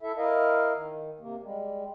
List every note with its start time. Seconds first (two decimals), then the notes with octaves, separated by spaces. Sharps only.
0.01 E4 A4 E5
0.18 E4 A#4 D#5 F5
0.76 D#3
1.20 C3 A#3
1.43 G3 G#3